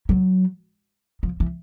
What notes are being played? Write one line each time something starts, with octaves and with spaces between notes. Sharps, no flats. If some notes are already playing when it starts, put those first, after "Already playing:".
F#3
F3
E3